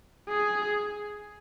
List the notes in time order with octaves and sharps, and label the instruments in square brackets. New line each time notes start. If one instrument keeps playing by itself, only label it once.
[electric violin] G#4